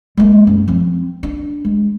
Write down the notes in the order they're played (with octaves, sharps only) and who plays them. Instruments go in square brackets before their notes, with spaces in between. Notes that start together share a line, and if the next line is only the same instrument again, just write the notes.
[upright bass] G#3 A#3
F#2
F3 C4
D4
G#3